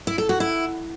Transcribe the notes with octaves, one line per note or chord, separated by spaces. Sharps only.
E4
A4
F#4
E4